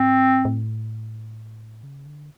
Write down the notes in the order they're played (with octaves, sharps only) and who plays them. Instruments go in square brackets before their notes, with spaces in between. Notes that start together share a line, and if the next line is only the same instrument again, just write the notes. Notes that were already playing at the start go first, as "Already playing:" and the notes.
Already playing: [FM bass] G#2 [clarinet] C4
[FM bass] A2
C#3
D3